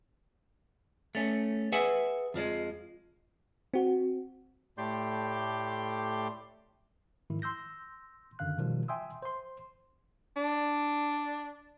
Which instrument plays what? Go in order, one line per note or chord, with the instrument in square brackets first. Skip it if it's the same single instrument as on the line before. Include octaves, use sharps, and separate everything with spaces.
[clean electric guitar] A3 C#4
G#4 B4 E5 F#5 G#5
F2 F3 G3 G#3
[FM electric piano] C4 F#4
[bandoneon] A2 A3 G4 D5 C6 G6
[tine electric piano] G#2 D#3 F3 E4
C6 E6 G6 A#6
F#2 D3 D#3 F5 F#6
B2 D#3 F3 G3
E5 G5 G#5 C6 D#6 E6
C5 C6
[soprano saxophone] D4